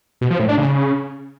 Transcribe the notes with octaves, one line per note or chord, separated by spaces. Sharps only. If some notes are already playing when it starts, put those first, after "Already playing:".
B2
F3
A2
D4
C#3